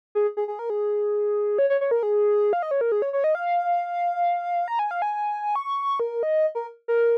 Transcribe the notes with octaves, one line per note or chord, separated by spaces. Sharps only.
G#4
G#4
G#4
A#4
G#4
C#5
C#5
C#5
A#4
G#4
F5
D#5
C#5
A#4
G#4
C#5
C#5
D#5
F5
A#5
G#5
F5
G#5
C#6
A#4
D#5
A#4
A#4